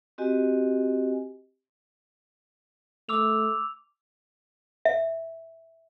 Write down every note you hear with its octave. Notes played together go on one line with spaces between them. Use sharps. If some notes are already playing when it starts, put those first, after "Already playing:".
C4 F#4 G4 D#5 G#5
A3 D6 E6 F7
E5